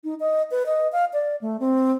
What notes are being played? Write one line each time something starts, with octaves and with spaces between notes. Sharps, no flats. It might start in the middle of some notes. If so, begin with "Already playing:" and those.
D#4
D#5
B4
D#5
F5
D5
A3
C4